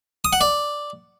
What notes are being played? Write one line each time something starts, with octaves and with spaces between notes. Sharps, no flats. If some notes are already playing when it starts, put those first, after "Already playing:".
D#6
F#5
D5